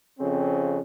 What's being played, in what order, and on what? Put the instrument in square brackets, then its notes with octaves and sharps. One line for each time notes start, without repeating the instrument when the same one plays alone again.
[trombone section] F2 C#3 C4